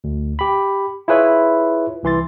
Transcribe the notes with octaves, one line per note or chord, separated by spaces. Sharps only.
D2
G4 B5
E4 F4 G#4 B4 C#5 E5
C2 E3 C6 A6